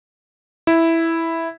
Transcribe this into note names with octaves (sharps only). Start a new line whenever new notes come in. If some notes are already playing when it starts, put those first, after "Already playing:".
E4